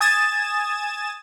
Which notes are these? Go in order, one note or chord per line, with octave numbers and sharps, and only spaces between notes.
G#5 D#6 G#6 A6 E7